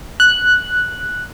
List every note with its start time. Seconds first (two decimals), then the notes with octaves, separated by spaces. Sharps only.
0.20 F#6